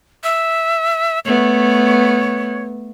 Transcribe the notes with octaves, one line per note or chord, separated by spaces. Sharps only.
E5
A3 B3 C#5